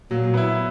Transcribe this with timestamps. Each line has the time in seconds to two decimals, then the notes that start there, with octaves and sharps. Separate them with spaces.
0.10 A#2 F#3
0.34 B3 E4